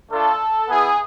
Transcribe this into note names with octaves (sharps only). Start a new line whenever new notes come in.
A3 D4 F4 A4
B3 E4 G#4